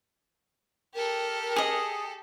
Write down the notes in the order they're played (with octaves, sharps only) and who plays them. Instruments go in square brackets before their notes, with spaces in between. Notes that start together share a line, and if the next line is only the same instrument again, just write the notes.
[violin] G4 A4 [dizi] A#4
[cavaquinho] G#4 D#5